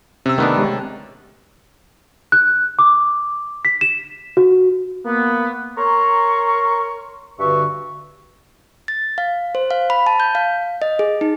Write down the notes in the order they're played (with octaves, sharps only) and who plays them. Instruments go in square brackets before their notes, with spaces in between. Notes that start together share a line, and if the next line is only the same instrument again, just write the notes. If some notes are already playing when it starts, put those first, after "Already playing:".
[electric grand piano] C3 E6 [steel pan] C#4
[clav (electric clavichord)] D#3 B3 D4 [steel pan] A3
[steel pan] G#3 G4 C#5
[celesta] F#6
D6
B6
E7
F#4
[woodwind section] A#3 B3
A#4 C#5 A#5 C6 C#6
G2 D3 F#4 B4 E5 C#6
[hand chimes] A6
F5
C5
F5
B5
A5
G6
F5
D#5
G#4
D#4